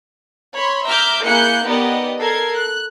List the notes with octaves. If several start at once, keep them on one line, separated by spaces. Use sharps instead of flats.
C#5 B5 C6
E5 A#5 D6 F6 G6
A#3 E4 G#4 F#6 G6 C#7
B3 D#4 G4 A#4 D5 D#5
A4 A#4 G#6 C7
F#6